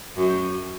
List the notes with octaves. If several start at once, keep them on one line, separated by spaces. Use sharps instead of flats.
F#2